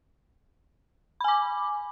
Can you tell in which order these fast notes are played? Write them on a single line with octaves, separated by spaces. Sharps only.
B5 G#5 D6